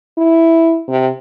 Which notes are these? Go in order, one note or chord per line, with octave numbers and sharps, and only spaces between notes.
E4
C3